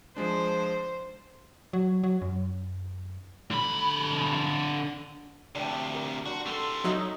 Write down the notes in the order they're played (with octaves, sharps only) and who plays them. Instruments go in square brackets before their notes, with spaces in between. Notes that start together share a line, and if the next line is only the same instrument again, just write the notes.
[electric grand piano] F3 G#3 D4 [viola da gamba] C5
[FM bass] F#3
F#3
F#2
[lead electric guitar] D3 B5
[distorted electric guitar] D2 C3 [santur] D4 G5
[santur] A#4
[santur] D4 C6 [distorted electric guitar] F#4
[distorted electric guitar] G3 C6 [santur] A4 D6 E6
[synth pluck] F#3 D#4 [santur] D#5 E5 F#5